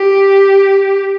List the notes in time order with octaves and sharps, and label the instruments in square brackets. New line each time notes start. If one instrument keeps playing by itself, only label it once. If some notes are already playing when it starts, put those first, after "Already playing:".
Already playing: [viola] G4